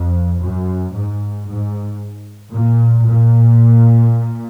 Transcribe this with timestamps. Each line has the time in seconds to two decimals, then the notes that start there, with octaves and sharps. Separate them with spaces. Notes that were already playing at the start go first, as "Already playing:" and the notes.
Already playing: F2
0.42 F#2
0.94 G#2
1.48 G#2
2.52 A#2
3.06 A#2